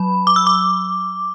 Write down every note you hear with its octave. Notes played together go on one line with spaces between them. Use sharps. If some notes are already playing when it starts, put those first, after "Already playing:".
Already playing: F#3 B5
D6
E6
D6